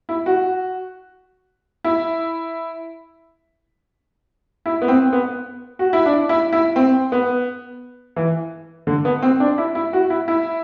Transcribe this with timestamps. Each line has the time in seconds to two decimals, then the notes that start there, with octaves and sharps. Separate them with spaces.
0.09 E4
0.26 F#4
1.84 E4
4.66 E4
4.82 B3
4.88 C4
5.13 B3
5.79 F#4
5.93 E4
6.06 D4
6.29 E4
6.53 E4
6.76 C4
7.12 B3
8.16 E3
8.87 D3
9.05 B3
9.22 C4
9.40 D4
9.58 E4
9.75 E4
9.93 F#4
10.10 E4
10.28 E4